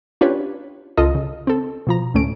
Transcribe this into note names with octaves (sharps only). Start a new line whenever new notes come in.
C#4 D4 F4 G4 B4 C#5
C#2 F4 A4 D#5
C#3
C4 A4
B2 F3 A#5
D2 A2 A3 C#4 D7